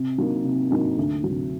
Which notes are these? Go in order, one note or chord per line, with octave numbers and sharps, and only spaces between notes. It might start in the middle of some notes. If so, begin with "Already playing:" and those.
Already playing: C3
F#3 A#3 D#4
C3
F#3 A#3 D#4
D2
C3 F#3